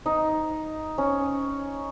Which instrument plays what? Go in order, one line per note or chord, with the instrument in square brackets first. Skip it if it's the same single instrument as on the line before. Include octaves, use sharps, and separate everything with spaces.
[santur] D#4
C#4